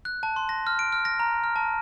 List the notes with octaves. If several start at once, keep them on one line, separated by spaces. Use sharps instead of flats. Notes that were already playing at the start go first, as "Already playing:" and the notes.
F#6
A5
C6
A#6
F6
D7
F6
A#6
A#5
F6
A5